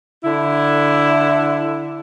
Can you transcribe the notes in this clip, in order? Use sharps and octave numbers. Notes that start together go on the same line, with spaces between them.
D3 E4